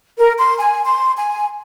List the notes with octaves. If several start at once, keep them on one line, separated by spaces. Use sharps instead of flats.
A#4
C6
G#5
C6
G#5